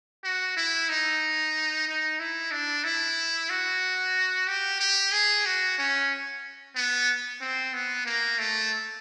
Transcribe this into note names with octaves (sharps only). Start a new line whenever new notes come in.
F#4
E4
D#4
D#4
E4
D4
E4
F#4
G4
G4
G#4
F#4
C#4
B3
C4
B3
A#3
A3